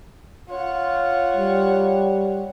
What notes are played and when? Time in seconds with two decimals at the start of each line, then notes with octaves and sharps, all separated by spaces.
0.50 F4 C#5 F#5
1.37 G3